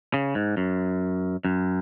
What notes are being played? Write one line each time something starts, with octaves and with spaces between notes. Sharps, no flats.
C#3
G#2
F#2
F#2